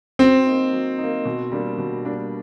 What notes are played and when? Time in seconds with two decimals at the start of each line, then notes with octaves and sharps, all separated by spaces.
0.19 F#3 C4
0.46 A#3 D#4
0.73 F#3
0.98 D#4
1.03 A#3
1.25 B2
1.52 G3 A#3 D4
1.78 B2
2.05 G3 A#3 D4